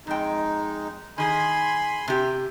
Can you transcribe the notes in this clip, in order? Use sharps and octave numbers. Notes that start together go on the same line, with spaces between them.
F2 G#3 D#4 G5
D#3 G#4 G#5 B5 C6
C3 G4